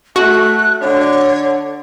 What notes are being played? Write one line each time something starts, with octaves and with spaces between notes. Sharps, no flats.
A3 F#4 F#6
D3 C#5